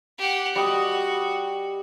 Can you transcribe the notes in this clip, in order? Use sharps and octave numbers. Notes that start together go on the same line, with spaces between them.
G4 F#5
G3 F#4 D#5